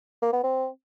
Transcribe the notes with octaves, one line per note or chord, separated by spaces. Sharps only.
A#3
B3
C4